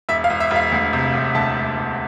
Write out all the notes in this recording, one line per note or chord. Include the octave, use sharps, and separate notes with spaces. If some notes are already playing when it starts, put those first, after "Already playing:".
E1 E5
F5
E1
E5
E1
F5
D2
C3
E1
D2 A5
E1
E1